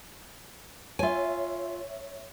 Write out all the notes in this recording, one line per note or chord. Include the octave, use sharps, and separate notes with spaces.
F4 C#5 E5 G#5